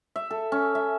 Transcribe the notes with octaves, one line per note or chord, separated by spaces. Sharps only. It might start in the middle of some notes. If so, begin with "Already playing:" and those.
E5
A4
C#4
E5